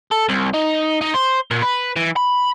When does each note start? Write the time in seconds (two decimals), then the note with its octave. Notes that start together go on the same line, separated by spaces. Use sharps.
0.11 A4
0.29 C2
0.54 D#4
1.01 D#4
1.14 C5
1.51 A#2
1.62 B4
1.96 E3
2.16 B5